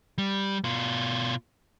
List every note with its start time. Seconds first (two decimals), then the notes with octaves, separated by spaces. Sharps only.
0.18 G3
0.64 B2 F4